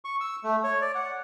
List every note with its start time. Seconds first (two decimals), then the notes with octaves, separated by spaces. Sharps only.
0.05 C#6
0.21 E6
0.44 A3
0.64 C#5
0.81 D5
0.95 F#5